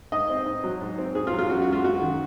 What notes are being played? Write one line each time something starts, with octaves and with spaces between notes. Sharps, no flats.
G#2 D#5
C4
G#2
F#3
G#2
C4
G#2 G#4
F4
F#3
F4
F#2 F#4
F#4
G#3
F4
F#2 F#4
D#3